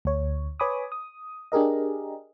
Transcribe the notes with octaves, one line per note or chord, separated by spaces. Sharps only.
D2 C#5
B4 C#5 G#5 B5 D6 D#6
D#6
D4 G4 G#4 A#4 D#5